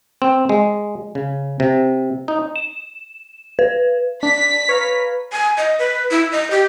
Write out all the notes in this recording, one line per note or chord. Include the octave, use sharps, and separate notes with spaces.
C4
G#3
C#3
C3
D#4
E7
B4
D4 B6
B4 C#5 F5 A#5
G#5
D#5
B4
E4
D#5
G4